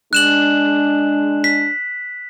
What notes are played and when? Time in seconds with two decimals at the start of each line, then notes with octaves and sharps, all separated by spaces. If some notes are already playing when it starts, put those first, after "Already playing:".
0.13 G#3 D4 F#6 E7 F#7
1.44 B6